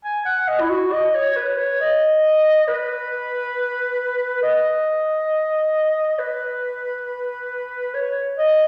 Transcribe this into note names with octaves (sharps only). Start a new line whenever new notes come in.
G#5
F#5
D#5
E4
F#4
D#5
C#5
B4
C#5
D#5
B4
D#5
B4
C#5
D#5